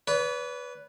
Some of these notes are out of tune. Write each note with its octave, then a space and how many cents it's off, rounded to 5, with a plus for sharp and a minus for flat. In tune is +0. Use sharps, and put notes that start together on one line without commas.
B4 +0 D5 -45